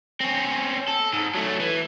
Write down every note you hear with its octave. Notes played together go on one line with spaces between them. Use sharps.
C4 C#4
A4
G#2
F#3 A3
E3